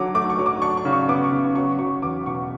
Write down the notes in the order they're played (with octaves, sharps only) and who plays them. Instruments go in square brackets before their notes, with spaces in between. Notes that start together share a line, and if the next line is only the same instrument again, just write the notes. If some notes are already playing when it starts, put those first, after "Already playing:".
Already playing: [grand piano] D3 F#3 D6
A3 D6
C#6
F#3
D6
D4 C#6
C#6
C#3
C#6
B3 D6
C#6
C#3
F#3 C#6
F#3 C#6
E2 D6
B2 C#6